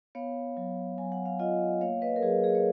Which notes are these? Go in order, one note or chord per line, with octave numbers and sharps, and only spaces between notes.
B3 C#5 F5
F#3
F#3 G#5
F#5
F5
F4 D#5 F#5
A#3 C#5 F5
B4 D#5
A#4
F#3 G#4 B4
G#4
C#5